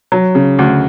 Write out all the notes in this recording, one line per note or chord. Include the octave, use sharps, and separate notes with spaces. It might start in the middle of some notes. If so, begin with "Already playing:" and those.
F#3
C#3
D2